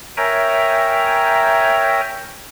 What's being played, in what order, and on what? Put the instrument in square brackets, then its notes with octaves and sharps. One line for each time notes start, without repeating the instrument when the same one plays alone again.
[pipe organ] A#4 C#5 E5 G5 G#5 A#5